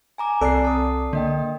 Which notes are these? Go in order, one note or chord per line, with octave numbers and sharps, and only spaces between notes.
G#5 A#5 D6
C2 C4 A4 D5 C7
A5 D#6
D3 A#3 D#5 G5